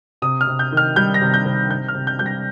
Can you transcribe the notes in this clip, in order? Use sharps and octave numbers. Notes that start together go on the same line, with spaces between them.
C3 D#6
F6
C3
G6
D#3 F6
G3 G6
A#6
C3
G6
C3
C3 G6
F6
C3
G6
G3 G6
A#6